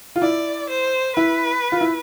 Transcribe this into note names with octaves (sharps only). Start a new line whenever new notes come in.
F4
E4 D5
C5
E4 B4
F4
E4